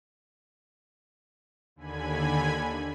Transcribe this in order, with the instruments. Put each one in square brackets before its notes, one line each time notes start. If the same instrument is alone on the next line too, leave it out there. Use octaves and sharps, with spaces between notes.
[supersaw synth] D#2 D3 G#5 B5 G#6